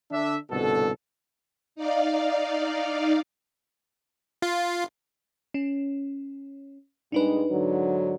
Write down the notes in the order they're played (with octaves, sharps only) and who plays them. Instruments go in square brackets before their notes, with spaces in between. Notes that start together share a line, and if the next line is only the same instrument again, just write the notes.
[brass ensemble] D3 D4 E5
G1 C2 B2 A4
[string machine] D#4 D5 F5
[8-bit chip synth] F4
[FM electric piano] C#4
[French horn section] A#2 G3 G#3 [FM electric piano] D4 D#4 B4
[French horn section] G#2 D3 F#3